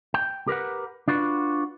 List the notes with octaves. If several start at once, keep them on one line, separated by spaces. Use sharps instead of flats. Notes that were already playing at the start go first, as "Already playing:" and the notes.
G5
G4 A#4 B4 F#5
D4 F4 F#4 B4